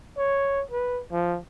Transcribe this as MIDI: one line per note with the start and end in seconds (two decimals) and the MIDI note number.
0.18 0.63 73
0.71 1.02 71
1.12 1.37 53